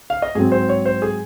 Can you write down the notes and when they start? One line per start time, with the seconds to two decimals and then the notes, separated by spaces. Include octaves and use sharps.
0.10 F5
0.22 D#5
0.35 G#2 F#3 C4 G#4
0.52 C5
0.69 C#5
0.86 C5
1.02 G#4